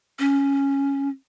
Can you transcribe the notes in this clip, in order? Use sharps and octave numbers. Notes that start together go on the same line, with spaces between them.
C#4